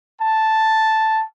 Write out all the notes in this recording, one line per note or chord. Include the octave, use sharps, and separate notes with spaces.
A5